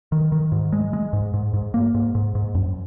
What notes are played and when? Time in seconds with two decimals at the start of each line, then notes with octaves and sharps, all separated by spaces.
0.12 D#3
0.32 D#3
0.52 G#2
0.73 G#3
0.93 G#3
1.13 G#2
1.34 G#2
1.54 G#2
1.74 A#3
1.94 G#2
2.15 G#2
2.35 G#2
2.55 F#2